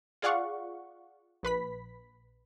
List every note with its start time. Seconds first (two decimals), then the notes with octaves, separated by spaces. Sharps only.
0.22 F4 G#4 D5 F5 F#5 C#6
1.43 A#1 B4 B5 B6